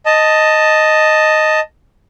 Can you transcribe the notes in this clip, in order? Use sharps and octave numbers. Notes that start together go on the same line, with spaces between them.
D#5 A5